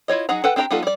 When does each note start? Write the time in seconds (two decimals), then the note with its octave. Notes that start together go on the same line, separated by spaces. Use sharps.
0.08 E4 F4 C#5 D#5
0.29 F#3 D#4 G#4 F#5 A#5
0.44 A4 B4 F#5 G5
0.56 C4 D4 G4 G5 A#5
0.71 G3 B3 D#4 F4 A4
0.83 G3 D5